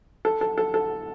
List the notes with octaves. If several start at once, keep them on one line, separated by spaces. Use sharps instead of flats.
A4
A4
A4
A4